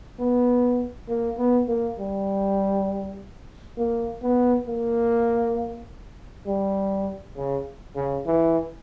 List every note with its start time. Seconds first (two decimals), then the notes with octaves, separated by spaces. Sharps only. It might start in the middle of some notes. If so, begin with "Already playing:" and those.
0.19 B3
1.08 A#3
1.38 B3
1.68 A#3
1.99 G3
3.78 A#3
4.22 B3
4.67 A#3
6.47 G3
7.37 C#3
7.96 C#3
8.26 E3